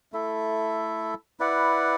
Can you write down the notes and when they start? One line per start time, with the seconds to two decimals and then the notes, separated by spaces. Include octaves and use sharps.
0.12 A3 E4 A4 E5
1.40 E4 B4 D5 F#5